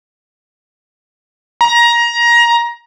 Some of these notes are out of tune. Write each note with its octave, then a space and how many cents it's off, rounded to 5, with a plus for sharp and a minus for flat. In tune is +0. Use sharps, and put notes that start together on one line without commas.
A#5 +20